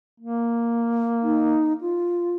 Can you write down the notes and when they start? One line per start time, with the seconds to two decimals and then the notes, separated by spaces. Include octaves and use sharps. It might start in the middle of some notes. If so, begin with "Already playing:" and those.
0.20 A#3
1.22 D#4
1.81 F4